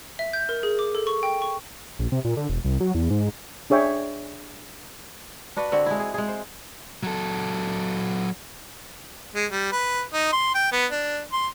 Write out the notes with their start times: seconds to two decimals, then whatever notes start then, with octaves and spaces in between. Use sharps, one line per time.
0.19 E5
0.33 G6
0.49 A#4
0.63 G#4
0.79 D6
0.95 A4
1.07 C#6
1.23 G5
1.42 C#6
1.99 A#1
2.12 C3
2.25 A#2
2.37 D3
2.49 E1
2.65 C2
2.80 F#3
2.95 E2
3.10 G#2
3.70 D4 G#4 C#5 E5 G5
5.56 D4 F#4 B4
5.72 D3 C4 F#4
5.86 G#3 E4
6.00 G#4
6.14 G#3 G#4
6.28 C5
7.03 F#3 A4
9.35 G#3
9.51 G3
9.72 B4
10.13 D#4
10.32 C6
10.55 G5
10.72 B3
10.91 D4
11.33 C6